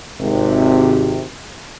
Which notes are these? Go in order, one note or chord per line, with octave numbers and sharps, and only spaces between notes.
G#1 C3